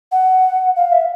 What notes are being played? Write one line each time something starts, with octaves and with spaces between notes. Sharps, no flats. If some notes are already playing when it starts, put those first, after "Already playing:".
F#5
F5
E5